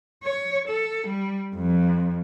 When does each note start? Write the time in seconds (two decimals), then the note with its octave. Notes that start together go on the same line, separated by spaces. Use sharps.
0.23 C#5
0.68 A4
1.07 G3
1.55 F2